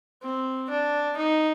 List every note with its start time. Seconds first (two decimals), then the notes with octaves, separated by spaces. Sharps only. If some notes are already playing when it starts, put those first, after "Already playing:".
0.22 C4
0.70 D4
1.17 D#4